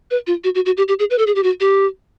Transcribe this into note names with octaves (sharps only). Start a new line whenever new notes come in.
B4
F4
F#4
F#4
F#4
G4
G4
G#4
B4
A4
G#4
G4
F#4
G4